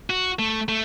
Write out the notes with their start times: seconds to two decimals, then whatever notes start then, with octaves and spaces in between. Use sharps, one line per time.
0.10 F#4
0.39 A3
0.69 A3